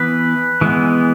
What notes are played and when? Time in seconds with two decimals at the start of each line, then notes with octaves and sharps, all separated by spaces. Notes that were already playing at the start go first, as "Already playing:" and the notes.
Already playing: E3 B3 B4
0.61 E3 G#3 B3